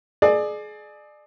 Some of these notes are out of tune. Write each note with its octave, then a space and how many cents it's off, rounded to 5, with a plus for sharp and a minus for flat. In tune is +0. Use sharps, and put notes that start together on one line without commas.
G#4 +30 D5 +30